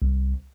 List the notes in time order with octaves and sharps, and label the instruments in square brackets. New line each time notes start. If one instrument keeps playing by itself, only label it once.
[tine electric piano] C2